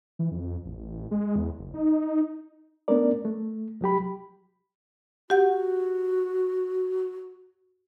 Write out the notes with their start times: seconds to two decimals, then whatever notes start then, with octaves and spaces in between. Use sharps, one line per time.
0.19 E3
0.31 F2
0.65 A1
1.11 G#3
1.36 E2
1.59 F#1
1.74 D#4
2.88 A3 B3 C#4 D4 A#4 D5
3.25 A3
3.81 C2 F#3 G4 B5
5.30 F#4 G4 F#5 G6